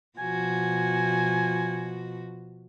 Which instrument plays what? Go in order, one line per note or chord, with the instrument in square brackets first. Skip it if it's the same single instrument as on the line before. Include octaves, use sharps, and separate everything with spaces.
[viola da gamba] B2 F3 F#4 [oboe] G#5